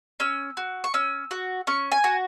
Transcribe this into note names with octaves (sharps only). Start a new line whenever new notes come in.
C#4 E6
F#4
C#6
C#4 E6
F#4
C#4 C#6
G#5
F#4